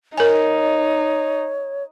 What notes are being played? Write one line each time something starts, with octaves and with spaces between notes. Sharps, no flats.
D#4 A#4 C#5 G#5